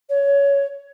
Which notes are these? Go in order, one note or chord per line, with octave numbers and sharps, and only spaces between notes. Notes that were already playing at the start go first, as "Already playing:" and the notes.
C#5